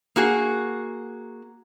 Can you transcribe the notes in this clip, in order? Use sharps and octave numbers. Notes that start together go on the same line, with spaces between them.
A#3 F#4 G#4